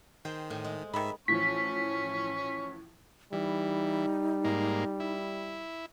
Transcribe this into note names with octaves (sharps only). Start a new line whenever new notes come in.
D#3 G#4 C5 G5
A2 C5 G#5
G#3
G#2 D#3 E5 B5
A2 E3 F3 C#4 C#6 B6
E3 G3 D#4
G#2 A#3
E4